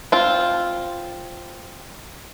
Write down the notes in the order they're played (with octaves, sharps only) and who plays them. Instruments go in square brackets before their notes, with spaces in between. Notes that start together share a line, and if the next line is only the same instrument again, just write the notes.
[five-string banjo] C4 F4